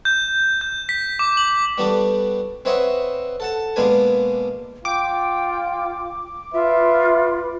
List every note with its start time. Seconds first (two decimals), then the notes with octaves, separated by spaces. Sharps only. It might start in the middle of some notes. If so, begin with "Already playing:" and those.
0.05 G6
0.61 G6
0.89 B6
1.19 D6
1.37 F#7
1.78 G3 B3 D4 F#4 A4
2.65 C4 B4 C#5 D#5 E5 F#5
3.40 A4 F#5 A5
3.76 B2 G#3 A#3 D4 B4 G#5
4.85 F4 G5 D6
6.54 F4 B4 E5